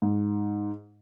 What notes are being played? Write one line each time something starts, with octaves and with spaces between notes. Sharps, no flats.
G#2